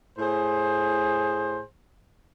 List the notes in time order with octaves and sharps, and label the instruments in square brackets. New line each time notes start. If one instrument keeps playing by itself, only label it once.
[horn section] A2 G#4 C5